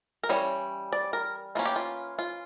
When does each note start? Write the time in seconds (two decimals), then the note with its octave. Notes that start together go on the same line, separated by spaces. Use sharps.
0.23 A#4
0.29 E3 G3 C#4 C#5
0.93 D5
1.13 A#4
1.55 E3 A#3 C#4 F4
1.65 G4
1.76 F4
2.19 F4